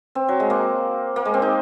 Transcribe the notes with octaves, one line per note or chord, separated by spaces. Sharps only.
C4
F#3
G#3
A#3
A#3
G#3
C4
D#4